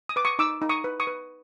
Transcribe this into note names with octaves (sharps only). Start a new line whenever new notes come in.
D#6
B4 D6
C#6 D#6
D#4 D6 E6
D#4
C#6 D#6
B4
C#6 D#6
B4